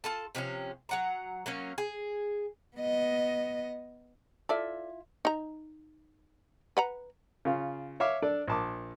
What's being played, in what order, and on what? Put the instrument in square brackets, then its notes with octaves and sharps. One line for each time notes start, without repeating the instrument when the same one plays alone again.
[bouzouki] F4 A4 A5
C3 F3 A#3 C#4
F#3 F#5 A#5
F#3 A#3 C#4
G#4
[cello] B3 D#5
[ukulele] E4 F4 E5 [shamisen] A4 D5
[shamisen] D#4 A#5
B4 F#5 A#5
[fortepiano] C#3 F4
C#5 E5 F5 D6
D4 A4 D5
A#1 A5 D6